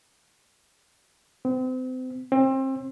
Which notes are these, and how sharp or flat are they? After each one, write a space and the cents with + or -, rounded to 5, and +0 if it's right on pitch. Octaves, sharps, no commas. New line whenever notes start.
C4 -35
C4 +30